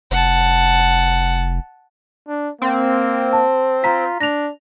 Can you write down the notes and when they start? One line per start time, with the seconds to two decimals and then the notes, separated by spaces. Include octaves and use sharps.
0.11 F1 F#5 A5
2.28 D4
2.62 A#3 C4
3.33 A5
3.84 F4 A#5 B6
4.21 D4 A#6 F7